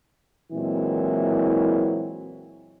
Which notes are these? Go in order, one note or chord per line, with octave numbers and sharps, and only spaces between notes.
A#2 E3 F#3 G#3 C4 E4